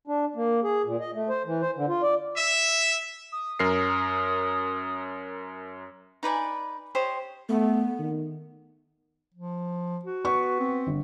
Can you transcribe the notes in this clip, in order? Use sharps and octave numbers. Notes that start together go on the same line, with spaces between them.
D4
A#3
G#4
A#2
D#5
A3
C5
E3
C5
D3
F4
D5
E5
D#6
F#2 A#4 C7
D#4 B4 D5 G#5
G4 C5 C#5 D#5
A3 B3
D#3
F3
F#4
B3 C#6
C4
G1